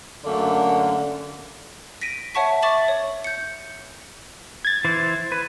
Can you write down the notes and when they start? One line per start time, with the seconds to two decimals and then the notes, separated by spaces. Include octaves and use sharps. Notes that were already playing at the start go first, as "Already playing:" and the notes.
0.24 F#2 D3 A3 A#3
2.01 A#6 B6 D7 D#7
2.35 C#5 E5 F#5 A5 C#6 B6
2.62 E5 C#6 D6 A6 E7 F#7
2.88 C#5
3.24 G6 C#7
4.65 G#6 A6
4.85 E3 C5
5.32 B4